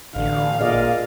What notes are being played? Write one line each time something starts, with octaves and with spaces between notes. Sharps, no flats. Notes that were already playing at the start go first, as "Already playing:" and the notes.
A1 D3 F5
A#2 G#4 D5 D#5